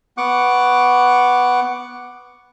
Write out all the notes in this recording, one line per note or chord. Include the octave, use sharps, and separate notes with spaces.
B3 F#5 C#6 D6 F#6